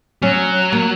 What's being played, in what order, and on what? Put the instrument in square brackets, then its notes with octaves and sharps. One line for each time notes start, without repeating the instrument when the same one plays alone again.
[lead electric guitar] F#3 [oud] C#4
[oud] A#3